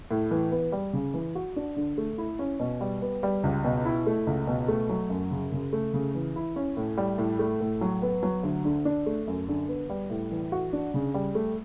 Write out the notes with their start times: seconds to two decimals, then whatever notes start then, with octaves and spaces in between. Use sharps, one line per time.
0.11 A2
0.31 E3
0.52 B3
0.72 G3
0.93 C#3
1.14 E3
1.35 F#4
1.56 D4
1.76 D3
1.98 A3
2.18 E4
2.39 C#4
2.60 B2
2.81 G3
3.02 B3
3.23 G3
3.44 C#2
3.64 B2
3.85 E4
4.07 A3
4.27 C#2
4.47 B2
4.68 A3
4.89 F#3
5.10 F#2
5.31 C#3
5.52 C#3
5.73 A3
5.93 C#3
6.15 E3
6.36 E4
6.56 C#4
6.77 A2
6.97 G3
7.18 A2
7.39 A3
7.60 A2
7.81 F#3
8.02 B3
8.23 F#3
8.43 D2
8.65 D3
8.85 D4
9.06 A3
9.27 F#2
9.48 D3
9.68 B3
9.90 G3
10.10 A2
10.31 E3
10.52 F#4
10.73 D4
10.94 C#3
11.14 G3
11.35 A3